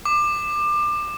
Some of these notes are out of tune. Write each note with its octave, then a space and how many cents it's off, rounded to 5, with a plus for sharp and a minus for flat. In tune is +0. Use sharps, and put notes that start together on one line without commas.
D6 +25